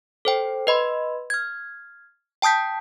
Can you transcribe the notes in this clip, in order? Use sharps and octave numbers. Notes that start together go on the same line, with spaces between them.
A4 C5 G5
B4 D#5 B5 C6
F6 G#6
G5 A5 D#6 G6 B6